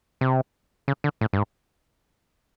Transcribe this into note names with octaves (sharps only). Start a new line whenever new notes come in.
C3
C#3
D3
A2
G2
G#2